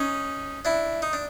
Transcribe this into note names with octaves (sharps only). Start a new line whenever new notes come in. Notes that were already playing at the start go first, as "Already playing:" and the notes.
Already playing: C#4 D#4
D4 E4
D#4
D4